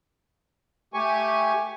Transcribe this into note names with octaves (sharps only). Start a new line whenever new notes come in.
A3 G4 G#5 C#6